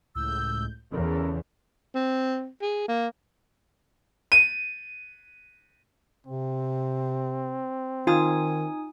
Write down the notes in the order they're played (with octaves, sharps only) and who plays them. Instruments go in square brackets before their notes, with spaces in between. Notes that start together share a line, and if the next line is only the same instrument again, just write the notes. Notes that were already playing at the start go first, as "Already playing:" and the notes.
[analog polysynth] C#2 A2 G6 [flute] E6
[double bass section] E2 C#3 E3 [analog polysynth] C#4 A4 [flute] A#4
[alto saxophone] C4
G#4
A#3
[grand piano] D#7
[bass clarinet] C3 [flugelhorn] C4
[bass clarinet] D#3 [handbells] D#4 G#5 D#6 [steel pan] F4